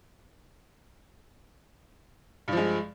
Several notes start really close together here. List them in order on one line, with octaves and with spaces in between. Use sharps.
G2 F3 G#3